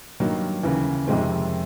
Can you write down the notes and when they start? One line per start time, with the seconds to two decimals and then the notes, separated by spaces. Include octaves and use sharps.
0.20 G2 D#3 F#3 A#3
0.63 D#2 C#3 E3
1.08 F2 C3 D#3 G#3 C4